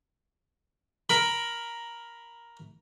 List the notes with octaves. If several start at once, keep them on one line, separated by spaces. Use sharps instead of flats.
A#4 B5